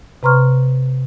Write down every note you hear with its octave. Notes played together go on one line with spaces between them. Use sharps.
C3 B4 A#5 C6 C#6 F6